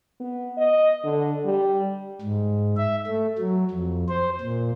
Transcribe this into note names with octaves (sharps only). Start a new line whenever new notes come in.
B3
D#5
D3
G3
G#2
E5
A3
F#3
F2
C5
A#2